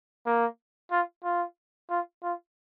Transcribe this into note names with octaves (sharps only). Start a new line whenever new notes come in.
A#3
F4
F4
F4
F4